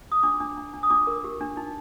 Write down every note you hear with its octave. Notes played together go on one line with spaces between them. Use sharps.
D#6
D4 D6
D4
D4
D4
D#6
D4 D6
A#4
G4
D4
D#4